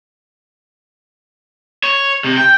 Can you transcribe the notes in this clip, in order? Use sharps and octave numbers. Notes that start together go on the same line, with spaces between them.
C#5
C3
G5